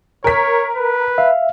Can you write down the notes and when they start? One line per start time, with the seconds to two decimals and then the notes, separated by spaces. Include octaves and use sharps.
0.24 A#4 C#5 B6
0.75 B4
1.18 E5 F5